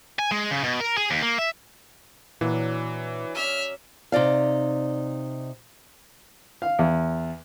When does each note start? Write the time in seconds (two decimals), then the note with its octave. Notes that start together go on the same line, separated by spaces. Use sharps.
0.19 G#5
0.32 G#3
0.51 C#3
0.64 B2
0.80 A#4
0.97 G#4
1.11 D#2
1.22 A#3
1.38 E5
2.41 A#2 E3 F#3 D4
3.35 C#4 D5 E5 F6
4.12 C3 D#4 D5 F5
6.62 F5
6.79 E2